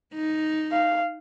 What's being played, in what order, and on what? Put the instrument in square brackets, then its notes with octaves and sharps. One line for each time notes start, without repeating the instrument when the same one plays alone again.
[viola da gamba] D#4
[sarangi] F5